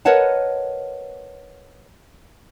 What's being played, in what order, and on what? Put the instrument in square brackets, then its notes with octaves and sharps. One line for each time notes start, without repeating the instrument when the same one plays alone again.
[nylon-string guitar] A#4 B4 C#5 D#5 F#5 A5